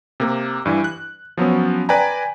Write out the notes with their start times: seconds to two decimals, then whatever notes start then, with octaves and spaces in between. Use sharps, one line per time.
0.20 C3 A#3
0.66 G2 E3
0.84 F#6
1.37 F3 F#3 B3 C#4
1.89 B4 D5 G5 G#5 A#5